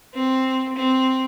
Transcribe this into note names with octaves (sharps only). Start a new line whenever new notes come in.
C4
C4